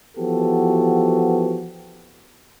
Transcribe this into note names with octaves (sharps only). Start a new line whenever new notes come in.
E3 F3 B3 F#4 G4 A4